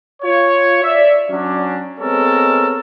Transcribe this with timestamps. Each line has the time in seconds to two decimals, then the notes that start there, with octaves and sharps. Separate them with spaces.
0.23 F4 C#5
0.83 D5 E5
1.30 F#3 C#4 D4
2.00 G#3 B3 C4 A4 A#4 C#5